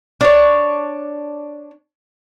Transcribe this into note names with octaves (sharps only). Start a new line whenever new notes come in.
D4 C#5